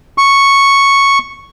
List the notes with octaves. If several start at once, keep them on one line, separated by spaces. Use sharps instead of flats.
C#6